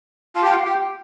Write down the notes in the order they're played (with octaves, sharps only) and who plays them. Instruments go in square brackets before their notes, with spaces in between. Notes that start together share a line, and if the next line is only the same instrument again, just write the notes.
[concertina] F4 [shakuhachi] A5
[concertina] G4 [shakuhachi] G5
[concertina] F4
[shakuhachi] F5
[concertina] G4 [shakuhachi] G5